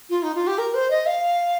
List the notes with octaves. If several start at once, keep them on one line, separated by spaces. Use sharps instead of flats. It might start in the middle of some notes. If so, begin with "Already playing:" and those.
F4
D#4
F4
G4
A#4
C5
D#5
F5